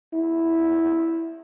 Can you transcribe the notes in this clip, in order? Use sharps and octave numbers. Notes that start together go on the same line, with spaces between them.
E4